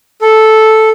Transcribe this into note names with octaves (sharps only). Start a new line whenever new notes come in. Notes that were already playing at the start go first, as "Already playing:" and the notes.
A4